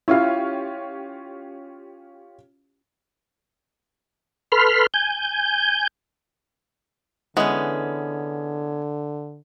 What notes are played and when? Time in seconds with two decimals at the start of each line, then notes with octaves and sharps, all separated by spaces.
0.08 C#4 E4 F4 G4 F5
4.52 A4 B4 B5 C6 F6
4.94 G#5 G6
7.37 D3 E3 G#3 B3 C#4